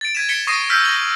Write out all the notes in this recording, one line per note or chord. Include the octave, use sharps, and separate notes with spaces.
A6 D7
G#6 B6 D#7 E7
B6 C#7 D7 G7
C#6 D#6 A#6 C7 D#7 E7
E6 F6 G6 B6
A#6 B6 F#7 G7